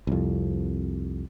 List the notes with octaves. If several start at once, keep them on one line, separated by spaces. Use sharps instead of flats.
C2 F2